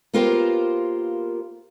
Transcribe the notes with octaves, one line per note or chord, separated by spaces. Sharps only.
A#3 B3 F4 G4 A#4 C5